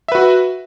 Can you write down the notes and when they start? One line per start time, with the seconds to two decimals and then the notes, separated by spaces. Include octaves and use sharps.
0.08 E5
0.12 B4
0.15 F#4